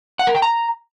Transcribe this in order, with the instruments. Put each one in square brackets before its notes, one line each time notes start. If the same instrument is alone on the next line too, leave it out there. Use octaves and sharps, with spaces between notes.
[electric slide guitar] F#5
A#4
G5
A#5